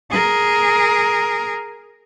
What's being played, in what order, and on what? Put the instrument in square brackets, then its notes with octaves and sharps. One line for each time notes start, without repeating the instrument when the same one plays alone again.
[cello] G#4 A#4